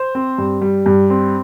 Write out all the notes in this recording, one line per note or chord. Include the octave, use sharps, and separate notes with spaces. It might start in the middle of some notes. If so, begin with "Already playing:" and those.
Already playing: C5
C4
G2
G3
G2
C4